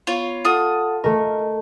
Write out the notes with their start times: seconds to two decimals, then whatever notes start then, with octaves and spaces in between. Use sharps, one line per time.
0.07 B3 F4 C#5
0.45 F4 A4 F#5 A5 D#6
1.04 A3 A#4 D#5